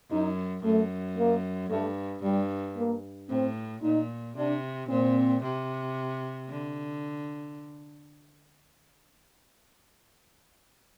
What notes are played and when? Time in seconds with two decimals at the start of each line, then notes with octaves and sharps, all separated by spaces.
0.10 F#2 D#4
0.64 F#2 A3
1.17 A#3
1.70 G2 A3
2.23 G2 G3
2.77 A#3
3.29 A2 C4
3.83 A#2 D#4
4.36 C3 D4
4.89 A#2 C4
5.43 C3
6.49 D3